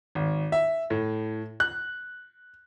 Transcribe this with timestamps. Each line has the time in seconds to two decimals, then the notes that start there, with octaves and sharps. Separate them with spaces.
0.15 G#1
0.52 E5
0.90 A2
1.60 F#6